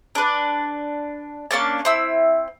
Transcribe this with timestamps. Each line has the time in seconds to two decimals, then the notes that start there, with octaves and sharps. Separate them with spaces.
0.15 D4 B4
1.51 A#3 C#4 D4 A5
1.85 C4 E4 E6